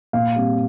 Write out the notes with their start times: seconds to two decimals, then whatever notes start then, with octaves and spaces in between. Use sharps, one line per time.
0.13 A#2 F5
0.36 G3 C4